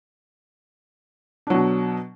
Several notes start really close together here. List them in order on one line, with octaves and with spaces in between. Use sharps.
D4 F#3 B2